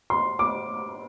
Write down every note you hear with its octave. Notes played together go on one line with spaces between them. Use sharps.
C6
D6